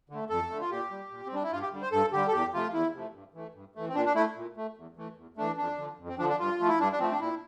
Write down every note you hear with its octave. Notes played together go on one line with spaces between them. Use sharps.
D3 A3
F2 A4
D3 A3
F4
A#2 G4
G3
A#2
C4
G3 D4
E4
G2 F4
G4
D3 G3
C5
G2 A4
D3 G3 G4
A4
E2 G4
C3 F3 A3 F4
E2 E4
C3 F3 A3
G2
E3 A3
G2
E3 A3
C4
A#2 D4
D4
A3 E4
A#2
A3
E2
E3 A3
E2
E3 A3 D4
F2 D4
D3 F3
F2
C4
D3 F3 D4
D4
G2 F4
F3 A3
E4
G2 D4
D4
F3 A3 C4
D4
A#2 E4